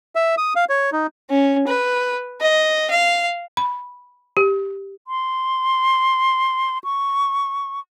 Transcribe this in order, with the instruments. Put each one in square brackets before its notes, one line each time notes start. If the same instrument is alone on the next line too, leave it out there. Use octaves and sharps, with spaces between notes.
[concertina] E5
D#6
F5
C#5
D#4
[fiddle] C#4
B4
D#5
F5
[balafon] B5
G4
[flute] C6
C#6